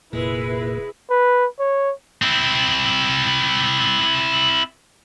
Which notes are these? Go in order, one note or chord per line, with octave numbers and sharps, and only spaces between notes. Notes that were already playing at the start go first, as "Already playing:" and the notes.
F1 A#2 G#3 E4 B4
B4
C#5
C4 E4